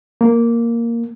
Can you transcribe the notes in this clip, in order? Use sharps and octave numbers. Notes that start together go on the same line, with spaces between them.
A#3